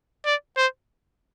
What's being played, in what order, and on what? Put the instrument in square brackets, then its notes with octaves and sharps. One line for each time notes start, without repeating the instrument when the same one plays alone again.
[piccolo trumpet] D5
C5